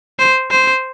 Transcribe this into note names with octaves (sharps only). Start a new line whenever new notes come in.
C5
C5